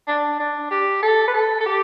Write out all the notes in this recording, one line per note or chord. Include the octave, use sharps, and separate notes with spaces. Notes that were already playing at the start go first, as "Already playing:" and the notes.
D4
D4
G4
A4
B4
A4
A4
G4